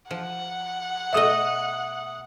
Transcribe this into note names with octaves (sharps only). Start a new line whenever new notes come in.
F3 F#5
B2 A3 D#5 E5 D#6